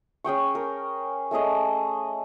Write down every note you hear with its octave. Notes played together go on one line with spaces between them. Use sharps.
C#4 G#4 G5 C#6
A#4
A3 C#4 G#4 D#5